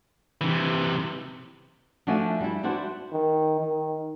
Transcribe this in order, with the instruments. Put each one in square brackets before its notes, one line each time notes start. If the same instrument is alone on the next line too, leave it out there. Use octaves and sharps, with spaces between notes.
[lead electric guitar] C3 E3
[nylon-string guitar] F3 A3 D4 F#4 E5 G#5
G3 E4
G3 D4 E4 F#4 C5
[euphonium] D#3
D#3